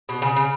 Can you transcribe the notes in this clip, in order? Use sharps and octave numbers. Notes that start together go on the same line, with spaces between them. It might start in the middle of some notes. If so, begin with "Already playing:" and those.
B2
C#3
C#3